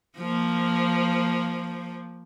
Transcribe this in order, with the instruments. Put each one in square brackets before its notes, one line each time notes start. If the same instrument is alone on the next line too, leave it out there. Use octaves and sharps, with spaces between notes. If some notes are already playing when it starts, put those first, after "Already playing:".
[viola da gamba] F3 A#3